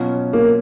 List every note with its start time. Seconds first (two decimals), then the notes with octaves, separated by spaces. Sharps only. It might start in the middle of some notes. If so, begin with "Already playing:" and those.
Already playing: B2 F#3 C#4 F4
0.33 A#3